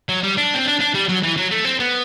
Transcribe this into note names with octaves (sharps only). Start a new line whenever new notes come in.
F#3
G3
D4
C4
D4
D4
G3
F#3
E3
F#3
A3
C4
B3